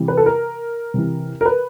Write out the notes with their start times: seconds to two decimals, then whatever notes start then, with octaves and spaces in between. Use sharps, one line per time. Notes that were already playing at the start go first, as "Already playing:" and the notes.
Already playing: C3 E3
0.08 B4
0.17 A4
0.26 A#4
0.94 C3 E3
1.41 A#4
1.46 B4